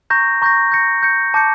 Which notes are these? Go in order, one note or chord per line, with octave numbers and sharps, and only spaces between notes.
A#5 C#6 G6 A#6
A#5 C#6 G6 A#6
G6 A#6 C#7
G6 A#6 C#7
A5 D6 G6 C#7